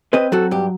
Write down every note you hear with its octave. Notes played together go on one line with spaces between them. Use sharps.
C4 B4 D#5
F#3 F#4 A4
G2 G4